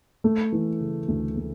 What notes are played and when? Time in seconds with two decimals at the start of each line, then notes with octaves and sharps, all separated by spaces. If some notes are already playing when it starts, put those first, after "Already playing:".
0.24 A3
0.52 E3
0.80 C#3
1.08 D2
1.37 A3